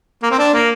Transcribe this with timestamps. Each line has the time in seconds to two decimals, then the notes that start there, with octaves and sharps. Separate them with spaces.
0.23 A#3
0.31 C4
0.39 D4
0.54 A#3